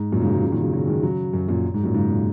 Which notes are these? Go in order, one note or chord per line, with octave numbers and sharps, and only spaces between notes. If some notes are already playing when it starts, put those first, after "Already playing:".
Already playing: G#2
F#2 A#2
G#2 C#3
C#3 F#3
C#3 F#3
A#2 D#3
C#3 F#3
C#3 F#3
D#3 G#3
C#3 F#3
F#2
F#2 A#2
G#2
F#2 A#2
G#2 C#3
A#2